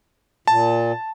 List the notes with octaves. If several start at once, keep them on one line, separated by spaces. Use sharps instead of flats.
A#2 A5